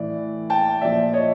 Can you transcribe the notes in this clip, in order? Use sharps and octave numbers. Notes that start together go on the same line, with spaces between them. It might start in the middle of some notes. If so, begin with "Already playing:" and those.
Already playing: A2 E3 D5
G5 A5
A#2 F3 D5 E5
C#5 D#5